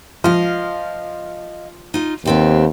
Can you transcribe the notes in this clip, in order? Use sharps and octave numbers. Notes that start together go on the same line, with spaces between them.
F3 D#5 F5
D#4 F4
D#2 B3 C4 G4